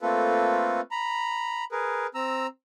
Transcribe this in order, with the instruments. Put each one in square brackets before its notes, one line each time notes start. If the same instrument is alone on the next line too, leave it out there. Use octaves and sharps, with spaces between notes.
[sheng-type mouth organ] A3 A#3 C4 F4 A4 B4
A#5 B5
G#4 A#4 B4
C4 A#5 E6